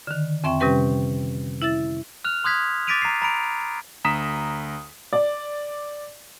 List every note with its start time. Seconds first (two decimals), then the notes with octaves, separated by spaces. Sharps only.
0.07 D3 D#3
0.44 F2 C4 E5 G5 C#6
0.60 C3 G3 C#4 G4 B4 G5
1.62 E4 E5 E6 A6
2.24 F6 F#6 F7
2.44 C6 D#6 F#6 G#6 B6
2.87 D6 A6 B6 D7 D#7 F7
3.02 A#5 C7
3.22 A#5 B5 D7
4.04 D2 A#5 D#6 B6 E7
5.13 D5